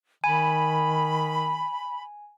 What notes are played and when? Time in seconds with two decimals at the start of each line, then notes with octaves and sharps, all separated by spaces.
0.24 D#3 G#5 B5